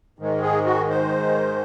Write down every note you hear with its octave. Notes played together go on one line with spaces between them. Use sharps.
G#2 D#3 G#3
G#4
F#4
C5